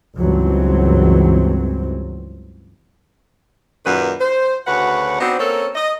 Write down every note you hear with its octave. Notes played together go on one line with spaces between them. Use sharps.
C#2 G2 E3 F#3 C4
F#2 A#2 D#3 G4 B4
C5
D2 C#3 F#4 B4 F#5
B3 C4 D4 D#4 F#4 C5
A#3 C4 C#4 A4 A#4
D#5